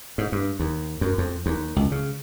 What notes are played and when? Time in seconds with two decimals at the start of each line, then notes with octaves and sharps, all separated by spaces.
0.18 G#2
0.32 G2
0.59 D#2
1.01 F#2
1.18 F2
1.46 D#2
1.76 C#2
1.92 C#3